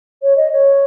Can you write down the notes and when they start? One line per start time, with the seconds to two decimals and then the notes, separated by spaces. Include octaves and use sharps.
0.22 C#5
0.37 D#5
0.52 C#5